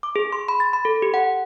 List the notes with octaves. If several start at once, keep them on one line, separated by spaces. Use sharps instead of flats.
D6
G#4
C6
B5
A6
B5
A4
G4
F#5